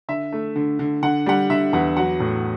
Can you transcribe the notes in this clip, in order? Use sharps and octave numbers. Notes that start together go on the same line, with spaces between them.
D3 E5
A3
D3
D3
D3 F#5
G3 F#5
D3 E5
E2 F#5
F#3 F#5
A2